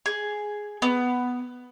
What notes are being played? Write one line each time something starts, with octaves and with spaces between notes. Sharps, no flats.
G#4
B3